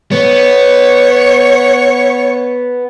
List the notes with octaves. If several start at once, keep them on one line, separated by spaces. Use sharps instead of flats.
B3 C#5